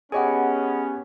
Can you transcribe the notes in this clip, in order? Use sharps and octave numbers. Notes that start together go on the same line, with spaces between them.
B3 C#4 G4 G#4 C#5 D#5 F#5 G#5